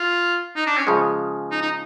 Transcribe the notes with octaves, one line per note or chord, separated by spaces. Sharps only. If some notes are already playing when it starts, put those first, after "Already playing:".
Already playing: F4
D#4
D4
C#4
C#3 F3 G#3
D#4
D#4